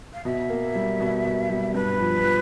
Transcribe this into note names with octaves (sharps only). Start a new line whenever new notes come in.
F5
B2 E5
A#3
G3
B2
B2
G3
G2 B4
F3
F3